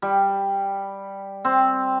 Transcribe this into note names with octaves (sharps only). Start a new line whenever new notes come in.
G3
C4